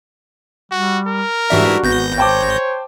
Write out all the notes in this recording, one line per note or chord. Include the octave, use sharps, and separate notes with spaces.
G3 F#4
A#4
G#2 E3 G3 D4 F#4 E5
G#1 B3 G6 A#6
C5 C#5 G5 A5 D6